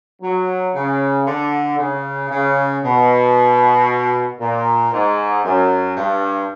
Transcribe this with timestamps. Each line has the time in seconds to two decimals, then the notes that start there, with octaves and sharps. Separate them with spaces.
0.22 F#3
0.74 C#3
1.27 D3
1.79 C#3
2.30 C#3
2.84 B2
4.40 A#2
4.92 G#2
5.45 F#2
5.97 G2